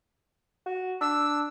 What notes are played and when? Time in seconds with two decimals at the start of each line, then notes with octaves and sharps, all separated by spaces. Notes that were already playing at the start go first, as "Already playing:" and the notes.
0.66 F#4
1.01 D4 E6